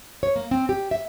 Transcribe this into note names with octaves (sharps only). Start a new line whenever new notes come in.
C#5
A#3
C4
G4
E5